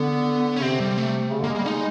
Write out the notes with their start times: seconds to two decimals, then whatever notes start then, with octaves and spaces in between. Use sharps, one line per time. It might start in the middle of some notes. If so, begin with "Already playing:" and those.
Already playing: D3 B3
0.56 C#4
0.62 C3 C4
0.80 G3
0.98 A3
1.32 C#3
1.40 D3 A#3
1.49 G#3
1.55 G3 A#3
1.66 G#3 D#4